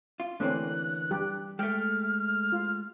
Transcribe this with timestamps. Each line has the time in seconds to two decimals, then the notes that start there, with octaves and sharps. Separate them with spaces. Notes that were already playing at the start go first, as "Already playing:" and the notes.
0.20 F4
0.40 D3 E3 A3 A#3 C4 C#4 F#6
1.11 G3 G4
1.59 G#3 A3 G5 F6
2.52 F4